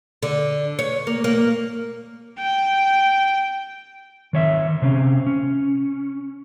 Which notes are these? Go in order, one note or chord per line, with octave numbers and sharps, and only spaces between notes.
D3
C#5
A#3
A#3
G5
D#3 C#5 E5
C3 C4 C#4
C#4